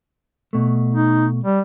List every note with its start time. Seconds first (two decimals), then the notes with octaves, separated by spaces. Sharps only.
0.53 B2 A3
0.94 D#4
1.44 G3